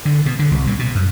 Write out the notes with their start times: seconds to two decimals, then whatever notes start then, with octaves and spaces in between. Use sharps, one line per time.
0.05 D3
0.26 B2
0.39 D3
0.51 C2
0.67 A#2
0.79 B2
0.95 F#2